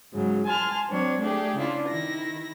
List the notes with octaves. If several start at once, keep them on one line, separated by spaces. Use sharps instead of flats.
G#2 C#3 F#3
G#5 A5 C6 F6
F#3 C4 D4 C#5
A3 D4 G4 G#4
C#3 D4 E4 F4
D#3 E4 A#6